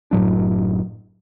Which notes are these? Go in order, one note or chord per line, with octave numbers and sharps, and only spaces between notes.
F#1 A2 F#3 D4